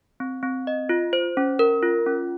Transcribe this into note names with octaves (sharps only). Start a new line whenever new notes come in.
C4
C4
D#5
F4
C5
C#4
A#4
F4
C#4